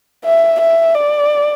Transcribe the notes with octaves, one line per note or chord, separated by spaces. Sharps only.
E5
E5
D5